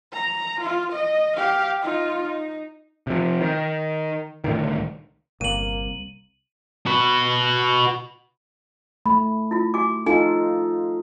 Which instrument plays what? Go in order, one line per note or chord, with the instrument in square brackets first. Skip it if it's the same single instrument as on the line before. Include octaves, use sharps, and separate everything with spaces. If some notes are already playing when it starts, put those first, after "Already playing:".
[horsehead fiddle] A#5
F4
D#5
G4 F5
D#4 F4
D#4
[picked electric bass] C3 F3
D#3
C2 A2 D3 D#3
[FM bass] G1 [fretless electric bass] C2 [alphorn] A#3 [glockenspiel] D#7 F#7
[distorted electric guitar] F#4 B4
[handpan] A3 [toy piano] B5
[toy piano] E4 F4
F#4 G#5 D6
[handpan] D#4 F4 A4 [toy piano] G#5